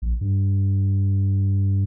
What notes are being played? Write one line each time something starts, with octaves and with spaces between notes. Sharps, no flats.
A#1
G2